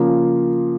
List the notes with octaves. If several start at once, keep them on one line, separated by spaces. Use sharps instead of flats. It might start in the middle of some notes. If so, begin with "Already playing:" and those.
Already playing: C#3 F3 A#3 F4